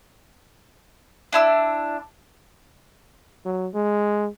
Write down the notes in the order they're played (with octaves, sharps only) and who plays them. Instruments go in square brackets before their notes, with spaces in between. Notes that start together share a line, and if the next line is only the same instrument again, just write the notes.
[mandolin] D4 E4 E6
[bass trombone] F#3
G#3